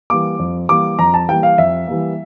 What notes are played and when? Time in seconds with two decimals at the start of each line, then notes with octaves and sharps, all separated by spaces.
0.10 E3 G3 A#3 D6
0.39 F2
0.69 E3 G3 A#3 D6
0.99 F2 A#5
1.14 A5
1.29 E3 G3 A#3 G5
1.43 F5
1.58 F2 E5
1.88 E3 G3 A#3